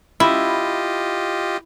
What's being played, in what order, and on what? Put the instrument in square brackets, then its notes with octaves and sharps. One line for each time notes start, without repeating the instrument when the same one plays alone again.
[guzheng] E4 [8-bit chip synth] F4 G4 D#5